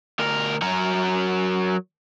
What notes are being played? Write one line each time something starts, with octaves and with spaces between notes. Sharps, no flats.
D2 A#4
F#3 A#4